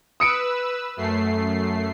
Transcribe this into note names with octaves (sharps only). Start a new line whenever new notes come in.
B4 D#6 E6 C#7 D7
F#2 A3 C7